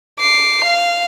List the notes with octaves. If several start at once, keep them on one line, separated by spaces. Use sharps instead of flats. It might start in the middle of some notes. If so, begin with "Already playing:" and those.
D6 C7
F5